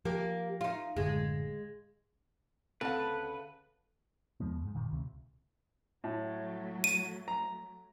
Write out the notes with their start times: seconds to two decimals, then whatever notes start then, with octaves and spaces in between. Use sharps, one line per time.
0.05 F3 A#3 G4
0.61 D#4 F4
0.97 F#1 A2 D3 G#3
2.81 D2 C#3 C4 A4 B4 F5 F#5 A5
4.40 E2 F3 G#3 B3
4.62 F2 G#2
4.75 F#1 A#2 D#3
4.91 C#2 C3
6.04 A2 F#3 A3
6.84 D#7
7.28 A#5